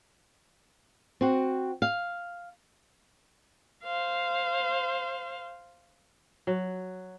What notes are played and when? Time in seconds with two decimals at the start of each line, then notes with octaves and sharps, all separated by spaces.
1.21 C4 F#4
1.82 F5
3.84 C5 F5
6.47 F#3